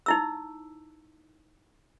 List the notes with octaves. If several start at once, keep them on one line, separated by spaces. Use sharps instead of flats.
D#4 E4 E6